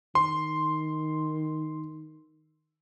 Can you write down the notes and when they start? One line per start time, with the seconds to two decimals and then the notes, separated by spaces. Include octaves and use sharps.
0.15 D#3 C6